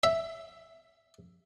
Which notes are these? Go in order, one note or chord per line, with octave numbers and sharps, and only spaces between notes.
E5